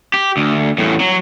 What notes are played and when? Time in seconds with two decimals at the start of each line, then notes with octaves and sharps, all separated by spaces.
0.14 G4
0.37 D2
0.78 E2 A2
1.00 F#3